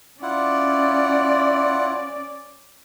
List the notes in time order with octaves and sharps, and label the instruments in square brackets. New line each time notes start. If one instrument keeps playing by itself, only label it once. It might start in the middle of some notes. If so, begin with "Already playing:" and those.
[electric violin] C#4 D5 [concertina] E4 F4 F#5